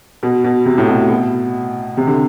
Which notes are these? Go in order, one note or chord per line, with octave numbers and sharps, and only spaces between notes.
B2
B2
C3
A2
B2
B2
C3
D3